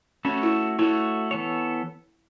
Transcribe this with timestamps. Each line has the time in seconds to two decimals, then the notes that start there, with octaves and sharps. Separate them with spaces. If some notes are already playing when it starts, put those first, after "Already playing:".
0.25 A3 C#4 F#4 A4 C#5
0.43 E4
0.79 A3 E4 F#4 A4 C#5
1.31 E3 B3 A4 C#5